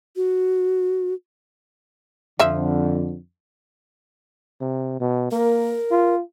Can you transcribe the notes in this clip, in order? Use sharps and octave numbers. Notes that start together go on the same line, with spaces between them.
F#4
F2 D3 F3 E5
C3
B2
A#3 A#4
F4